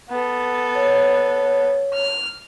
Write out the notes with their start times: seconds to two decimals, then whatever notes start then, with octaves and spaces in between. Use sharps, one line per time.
0.10 B3 A4
0.75 C#5
1.93 F6